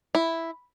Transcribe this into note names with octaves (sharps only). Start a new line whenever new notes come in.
E4